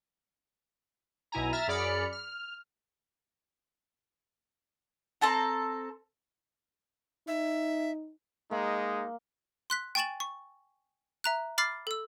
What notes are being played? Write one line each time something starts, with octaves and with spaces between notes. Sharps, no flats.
B1 B2 E4 G#5 A#5
E5 A#5 F6 A6
F#2 G#4 D5 B5 F6 C#7
F6
C4 A4 A5 A#5
D#4 E5
G#3 A#3 D#4
C6 F#6 B6
G5 G#5 C#6 A6 E7 F#7
C#6
E5 A#5 F#6
B5 D6 F6 A6 C7
A4 E6